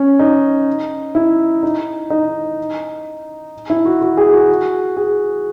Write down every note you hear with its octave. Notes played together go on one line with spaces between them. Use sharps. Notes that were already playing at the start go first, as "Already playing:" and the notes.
Already playing: C#4
D#4
E4
D#4
D#4
E4
F#4
F#4
G#4
F#4
G#4